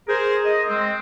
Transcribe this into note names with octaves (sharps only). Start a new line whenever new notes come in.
G#4 A#4 C5
D#5
G#3 C4